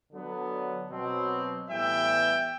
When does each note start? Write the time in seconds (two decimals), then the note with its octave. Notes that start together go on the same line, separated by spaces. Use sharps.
0.13 D3 F#3 B3
0.91 B2 F#3 C4
1.69 A2 E3 G3 B3 E5 G5